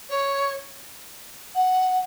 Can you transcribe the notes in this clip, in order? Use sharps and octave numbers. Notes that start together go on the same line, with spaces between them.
C#5
F#5